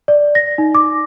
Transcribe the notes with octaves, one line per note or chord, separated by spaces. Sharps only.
D5
A#6
D#4
D6